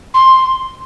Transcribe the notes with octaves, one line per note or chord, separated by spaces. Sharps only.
C6